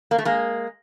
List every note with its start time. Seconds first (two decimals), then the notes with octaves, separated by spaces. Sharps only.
0.11 A#3
0.18 A3
0.25 G#3 A#3